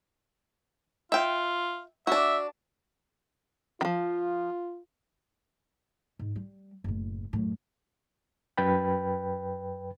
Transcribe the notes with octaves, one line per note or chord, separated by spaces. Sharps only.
F4 E5 G5
D4 F#4 E5
D#3 F3 F4
G#2
G3
F#1 A2
F#2 A2
F#2 B4 G5 B5